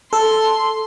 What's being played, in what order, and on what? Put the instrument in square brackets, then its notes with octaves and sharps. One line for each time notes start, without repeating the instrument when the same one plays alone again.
[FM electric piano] A4 [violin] C6